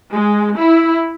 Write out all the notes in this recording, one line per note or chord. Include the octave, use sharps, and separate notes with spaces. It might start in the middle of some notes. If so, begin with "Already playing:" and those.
G#3
E4